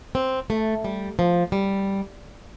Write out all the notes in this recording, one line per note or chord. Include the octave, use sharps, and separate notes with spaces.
C4
A3
G3
F3
G3